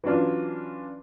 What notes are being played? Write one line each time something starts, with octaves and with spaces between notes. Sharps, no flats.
E3 F#3 C#4 D4 F4